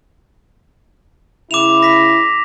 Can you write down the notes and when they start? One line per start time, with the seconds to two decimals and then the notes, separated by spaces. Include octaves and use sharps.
1.51 C#3 E4 D6 E7 F7
1.83 A#6 B6